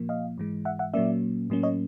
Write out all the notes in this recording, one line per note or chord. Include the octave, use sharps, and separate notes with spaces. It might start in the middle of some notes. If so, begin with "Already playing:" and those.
Already playing: A#2 F3 A#3
D#5 F5
G#2 E3 G#3
E5 F#5
E5 F#5
A#2 F#3 A#3 C#4 D5 E5
A2 F#3 A#3 C#4
C#5 D#5